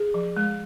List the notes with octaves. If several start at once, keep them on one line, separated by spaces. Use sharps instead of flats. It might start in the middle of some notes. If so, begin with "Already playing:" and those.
Already playing: G#4
F3
G#3